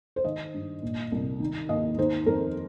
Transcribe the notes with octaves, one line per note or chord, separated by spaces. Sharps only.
C5
D#3 D#5
G2
A#2
C2
D#3
D#2 D#5
D#3 C5
F2 A#4